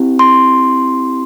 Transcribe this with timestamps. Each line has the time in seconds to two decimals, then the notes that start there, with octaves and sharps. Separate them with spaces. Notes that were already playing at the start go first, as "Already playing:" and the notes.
Already playing: C4 E4 G4
0.19 C6